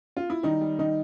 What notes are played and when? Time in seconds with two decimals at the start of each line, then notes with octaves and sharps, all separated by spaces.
0.17 F4
0.30 E4
0.43 D#3 G3 D#4
0.61 G3
0.79 D#3 G3 D#4